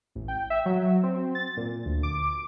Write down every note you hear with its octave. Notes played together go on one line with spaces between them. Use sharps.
A1
G5
E5
F#3
C4
A6
A#2
D2
D6